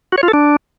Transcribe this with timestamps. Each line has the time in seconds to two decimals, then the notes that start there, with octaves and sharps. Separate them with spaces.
0.12 F#4
0.18 C#5
0.23 F4
0.28 A4
0.33 D4